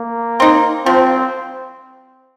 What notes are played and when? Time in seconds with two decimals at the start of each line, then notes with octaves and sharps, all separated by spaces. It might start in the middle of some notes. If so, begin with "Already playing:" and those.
Already playing: A#3
0.40 C4 D#4
0.85 F3 C4